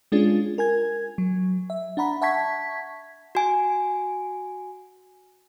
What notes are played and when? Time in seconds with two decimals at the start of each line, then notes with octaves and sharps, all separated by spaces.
0.12 G#3 C#4 D4 F4 G#4
0.58 A#4 G#5 G#6
1.18 F#3
1.70 E5
1.97 D4 F#5 A#5 B5
2.21 E5 F#5 A5 C#6 G#6 B6
3.35 F#4 G#5